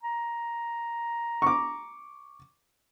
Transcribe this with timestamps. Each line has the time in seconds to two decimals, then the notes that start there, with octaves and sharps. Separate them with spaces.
0.03 A#5
1.42 C#6 D6